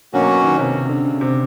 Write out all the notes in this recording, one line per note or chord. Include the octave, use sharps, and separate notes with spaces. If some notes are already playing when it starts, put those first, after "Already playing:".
B2 D3 F#3 A#3 C#4 F#4
D#3
C3
C#3
D3
C#3
C3